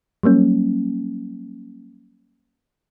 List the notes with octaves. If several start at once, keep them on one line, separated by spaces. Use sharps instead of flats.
F#3 G3 A#3 C#4